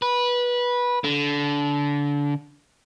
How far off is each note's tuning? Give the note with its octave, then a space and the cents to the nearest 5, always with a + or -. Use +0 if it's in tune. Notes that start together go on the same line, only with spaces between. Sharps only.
B4 -15
D3 -25